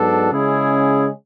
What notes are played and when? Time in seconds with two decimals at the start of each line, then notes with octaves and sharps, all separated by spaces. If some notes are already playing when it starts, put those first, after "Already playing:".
Already playing: G#2 F#3 B3 D4 A4
0.31 C#3 G#3 C#4 E4 G#4